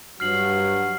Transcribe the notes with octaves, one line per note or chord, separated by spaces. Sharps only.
G2 F#3 F#4 F6 C7 F#7